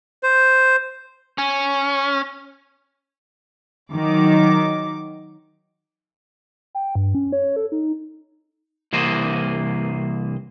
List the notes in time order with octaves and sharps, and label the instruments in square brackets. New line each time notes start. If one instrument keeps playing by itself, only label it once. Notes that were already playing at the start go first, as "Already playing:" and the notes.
[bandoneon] C5
[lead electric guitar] C#4
[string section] D#3 F#3 D6
[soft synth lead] G5
G2
C#4
C#5
A4
D#4
[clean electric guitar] C2 E3 A#3 C5 D#5